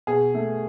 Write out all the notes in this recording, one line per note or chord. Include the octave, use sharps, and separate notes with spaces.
B2 G#4
A3